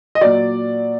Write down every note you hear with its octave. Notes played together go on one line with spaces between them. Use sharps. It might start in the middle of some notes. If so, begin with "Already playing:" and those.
D#5
A#2 F#3 D5